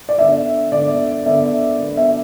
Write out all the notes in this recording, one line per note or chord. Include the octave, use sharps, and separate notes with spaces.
D5
D3 B3 E5
D3 B3 D5
D3 B3 E5
D3 B3
E5